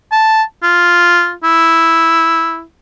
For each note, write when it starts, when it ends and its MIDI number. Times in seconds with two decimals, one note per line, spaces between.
0.12 0.43 81
0.63 1.33 65
1.44 2.63 64